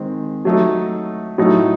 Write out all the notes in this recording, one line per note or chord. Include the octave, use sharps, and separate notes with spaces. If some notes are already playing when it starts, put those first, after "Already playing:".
Already playing: D#3 G#3 C4
F#3 A3 D#4
A2 F#3 A3 D#4